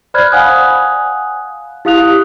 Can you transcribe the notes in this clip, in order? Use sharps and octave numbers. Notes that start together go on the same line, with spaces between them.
C5 D5 B5 F6 F#6 G#6
F5 F#5 G#5 D#6 F#6
E4 G4 F5 D#6 F#6 F7